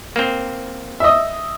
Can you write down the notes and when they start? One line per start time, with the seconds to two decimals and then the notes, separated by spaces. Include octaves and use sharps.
0.16 A#3 C4
1.00 D#5 E5